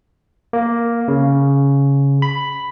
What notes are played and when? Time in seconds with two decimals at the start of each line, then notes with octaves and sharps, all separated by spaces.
0.53 A#3
1.08 C#3
2.22 B5